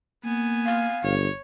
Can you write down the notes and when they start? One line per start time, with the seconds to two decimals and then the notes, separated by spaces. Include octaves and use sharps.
0.25 A#3 B3 G#5
0.66 F5
1.03 G1 C#5